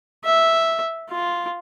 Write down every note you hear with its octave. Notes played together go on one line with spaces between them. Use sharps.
E5
F4